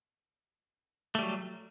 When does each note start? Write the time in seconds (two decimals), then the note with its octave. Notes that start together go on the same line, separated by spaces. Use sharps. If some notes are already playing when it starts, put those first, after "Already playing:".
1.15 A3
1.19 G3
1.22 F#3